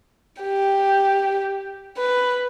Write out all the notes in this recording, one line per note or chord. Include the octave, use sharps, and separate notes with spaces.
G4
B4